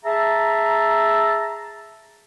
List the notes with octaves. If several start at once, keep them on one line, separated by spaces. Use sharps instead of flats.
G#4 E5 A5 A#5